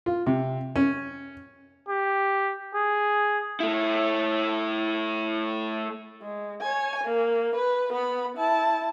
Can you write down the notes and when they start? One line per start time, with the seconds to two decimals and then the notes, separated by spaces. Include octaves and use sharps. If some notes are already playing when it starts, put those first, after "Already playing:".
0.06 F4
0.26 C3
0.76 C#4
1.89 G4
2.75 G#4
3.60 A3 E4
6.22 G#3
6.62 C#5 G#5
7.04 A#3
7.55 B4
7.93 B3 B5
8.37 E4 A5